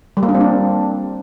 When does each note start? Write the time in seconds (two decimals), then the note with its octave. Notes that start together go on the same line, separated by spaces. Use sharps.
0.17 G3
0.23 A#3
0.29 D4
0.35 C4
0.40 D4